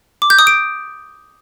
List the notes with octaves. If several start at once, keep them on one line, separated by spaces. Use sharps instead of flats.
D6
G6
D#6
D7